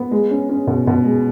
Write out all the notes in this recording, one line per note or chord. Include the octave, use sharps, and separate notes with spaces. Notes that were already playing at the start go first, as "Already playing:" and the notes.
Already playing: B3
G#3
C#4
C#4
B2
B2
G#3